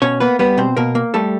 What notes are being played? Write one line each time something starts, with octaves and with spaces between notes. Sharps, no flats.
B2 C#4 C#5
A#3 B3 B4
G3 B3 B4
B2 C4 C5
B2 A#3 A#4
A#3
G3 A3 A4